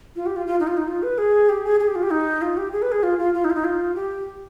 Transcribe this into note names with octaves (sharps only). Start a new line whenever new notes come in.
F4
G4
F4
F4
D#4
F4
D#4
F4
B4
G#4
G4
G#4
G#4
G4
F4
G4
D#4
F4
G4
G#4
B4
G#4
F4
F4
F4
D#4
F4
D#4
F4
G4